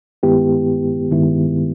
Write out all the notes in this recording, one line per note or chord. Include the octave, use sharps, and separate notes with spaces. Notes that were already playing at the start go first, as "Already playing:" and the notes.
G2 D#3 G#3 B3 E4 G4
G2 D#3 G#3 B3 E4